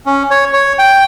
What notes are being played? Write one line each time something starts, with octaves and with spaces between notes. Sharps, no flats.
C#4
C#5
C#5
G5